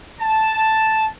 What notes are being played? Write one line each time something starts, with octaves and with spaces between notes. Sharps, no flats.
A5